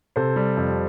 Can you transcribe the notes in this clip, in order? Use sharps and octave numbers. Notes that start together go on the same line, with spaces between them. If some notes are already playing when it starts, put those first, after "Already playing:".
C3 A4 C5
G3
F2